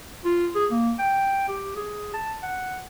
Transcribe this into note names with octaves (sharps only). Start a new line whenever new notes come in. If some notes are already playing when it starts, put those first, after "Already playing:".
F4
G#4
A#3
G5
G4
G#4
A5
F#5